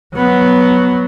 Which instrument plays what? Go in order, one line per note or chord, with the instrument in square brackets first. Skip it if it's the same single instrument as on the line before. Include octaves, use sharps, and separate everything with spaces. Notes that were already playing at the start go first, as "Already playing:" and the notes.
[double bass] F#3 B3